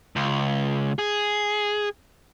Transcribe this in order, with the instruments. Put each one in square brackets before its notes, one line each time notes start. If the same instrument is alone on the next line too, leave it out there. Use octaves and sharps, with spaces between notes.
[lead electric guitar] C#2
G#4